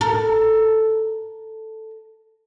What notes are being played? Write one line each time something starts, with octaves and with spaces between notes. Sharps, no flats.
A4 A#4